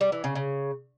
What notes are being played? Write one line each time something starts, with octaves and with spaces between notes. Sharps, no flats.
G3
E3
C#3
C#3